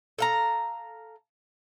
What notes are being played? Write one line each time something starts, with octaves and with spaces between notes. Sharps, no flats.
A4 F5 A#5